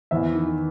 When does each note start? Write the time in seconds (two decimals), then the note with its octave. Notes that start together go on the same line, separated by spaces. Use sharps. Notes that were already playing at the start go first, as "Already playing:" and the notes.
0.11 E2 E5
0.35 D#3